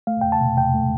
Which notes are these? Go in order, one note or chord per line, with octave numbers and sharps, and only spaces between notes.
A3 F5
E2 G5
A5
B2
E2 G5
A3